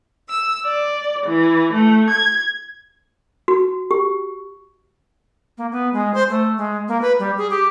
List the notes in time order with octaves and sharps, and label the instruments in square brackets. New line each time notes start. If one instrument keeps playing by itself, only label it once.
[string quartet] E6
D5
E3
A3
G#6
[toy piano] F#4
G4
[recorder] A#3
B3
G#3
C5
A3
G#3
A#3
B4
G3
G#4
G4